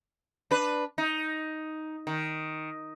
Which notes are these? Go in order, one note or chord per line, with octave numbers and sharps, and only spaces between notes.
D4 B4
D#4
D#3